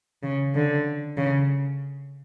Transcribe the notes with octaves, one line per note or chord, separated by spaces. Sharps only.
C#3
D3
C#3